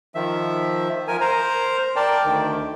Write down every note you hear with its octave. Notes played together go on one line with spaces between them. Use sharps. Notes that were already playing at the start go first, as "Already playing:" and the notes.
D#3 F3 E5
F3 A#4 G#5
A#4 C5 A#5
A#4 D5 G5 A5
D2 D#3